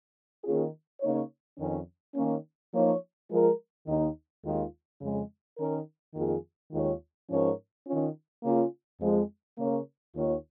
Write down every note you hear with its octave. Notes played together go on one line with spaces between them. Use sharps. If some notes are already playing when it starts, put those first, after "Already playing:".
D#3 A#3 C#4 F4 G#4
C#3 A#3 D#4 C#5
F2 D#3 C#4
D#3 A#3 C#4
F3 A#3 D#4 C#5
F3 G#3 F4 A#4
D#2 D#3 A#3 D#4
D#2 D#3 G#3 F4
F2 C#3 G#3
D#3 C#4 A#4
F2 D#3 A#3 F4 G#4
D#2 D#3 G#3 F4 C#5
G#2 F3 C#4 A#4 C#5
D#3 C#4 F4
C#3 A#3 C#4 F4 G#4
F2 F3 G#3
C#3 A#3 C#4 A#4 C#5
D#2 D#3 A#3 F4 C#5